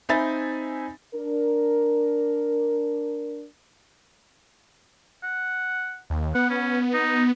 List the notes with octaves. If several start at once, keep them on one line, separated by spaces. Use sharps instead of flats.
C4 D#4 E5 G#5 B5 A6
D4 A#4
F#5
D#2
B3 F#5
C#4
D#4